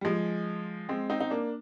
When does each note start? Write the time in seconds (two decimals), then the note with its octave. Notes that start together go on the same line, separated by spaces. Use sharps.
0.01 G3
0.05 F3 G#3
0.89 G#3 C4
1.10 C4 D#4
1.20 D#4
1.31 A#3 D4